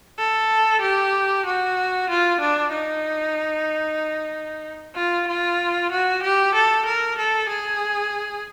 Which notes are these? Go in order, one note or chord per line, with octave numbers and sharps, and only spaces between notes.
A4
G4
F#4
F4
D4
D#4
F4
F4
F#4
G4
A4
A#4
A4
G#4